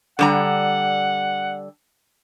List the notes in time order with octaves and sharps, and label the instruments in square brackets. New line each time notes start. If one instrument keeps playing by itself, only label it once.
[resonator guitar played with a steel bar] D3 G3 A#5 [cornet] F#5